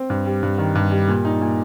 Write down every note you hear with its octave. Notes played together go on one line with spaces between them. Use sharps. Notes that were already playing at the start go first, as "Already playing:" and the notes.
Already playing: C4
G2
G3
G2
D#3
G2
G3
A#2
D#4
A#2